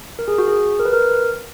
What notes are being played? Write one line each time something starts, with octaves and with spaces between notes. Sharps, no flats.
A#4
G#4
F#4
G#4
A#4
B4
A#4